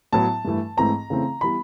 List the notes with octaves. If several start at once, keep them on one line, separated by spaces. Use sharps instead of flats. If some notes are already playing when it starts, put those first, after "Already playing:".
A2 F#3 B3 A5
G2 E3 A3
G#2 E3 A3 C4 A#5
C#3 E3 A3 C4
E3 G3 B3 B5